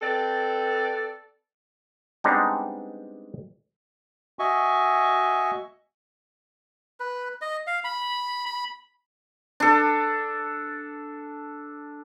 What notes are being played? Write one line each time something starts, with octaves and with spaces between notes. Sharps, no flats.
C4 A4 B4 D5
G3 G#3 B3 C4 D4 D#4
F#4 D#5 E5 G#5 C#6
B4
D#5
F5
B5
B5
D4 A4